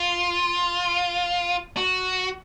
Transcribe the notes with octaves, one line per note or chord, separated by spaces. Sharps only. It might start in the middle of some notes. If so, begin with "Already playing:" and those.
Already playing: F4
F#4